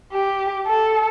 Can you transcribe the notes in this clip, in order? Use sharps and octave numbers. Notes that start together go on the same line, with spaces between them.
G4
A4